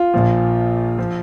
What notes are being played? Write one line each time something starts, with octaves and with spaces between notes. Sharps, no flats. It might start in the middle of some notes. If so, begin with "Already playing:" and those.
Already playing: F4
A#1 A#2 F3
F3